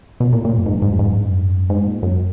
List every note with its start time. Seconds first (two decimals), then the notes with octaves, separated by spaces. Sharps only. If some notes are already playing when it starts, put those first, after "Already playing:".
0.20 B2
0.33 A#2
0.45 A#2
0.58 F#2
0.66 G#2
0.74 F#2
0.82 G#2
0.91 F#2
0.99 G#2
1.07 F#2
1.15 G#2
1.23 F#2
1.70 G#2
1.87 A#2
2.03 F#2